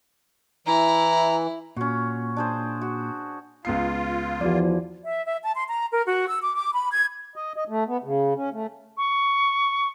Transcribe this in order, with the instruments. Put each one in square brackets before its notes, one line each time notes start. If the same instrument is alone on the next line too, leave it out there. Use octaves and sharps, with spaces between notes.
[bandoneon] E3 [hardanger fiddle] E4 [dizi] A#5
[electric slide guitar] A#2 [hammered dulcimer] C#4 F#4
[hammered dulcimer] D4 G#4 C5
F#4
[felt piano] C#2 B3 C7 [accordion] F4
[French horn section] E2 F3 [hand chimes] F#4 D5
[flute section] E5
E5
A5
C6
A#5
A#4
F#4
E6
D6
D6
B5
G#6
[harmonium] D#5
D#5
A3
B3
C#3
C#4
A3
[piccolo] C#6